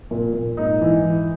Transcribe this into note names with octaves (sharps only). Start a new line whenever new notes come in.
A#2
A#2
G#2 D#4
E3
E3